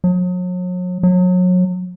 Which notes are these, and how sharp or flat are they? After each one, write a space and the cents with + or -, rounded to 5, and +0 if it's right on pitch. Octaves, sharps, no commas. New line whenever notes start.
F#3 -40
F#3 -30